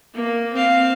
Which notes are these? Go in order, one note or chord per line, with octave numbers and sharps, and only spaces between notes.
A#3
C4 F5